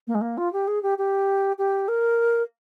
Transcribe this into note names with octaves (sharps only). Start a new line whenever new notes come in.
A#3
G#3
A#3
F4
G4
G#4
G4
G4
G4
A#4